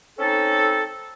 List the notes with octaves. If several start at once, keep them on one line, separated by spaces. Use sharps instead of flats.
C4 C#4 D#4 A4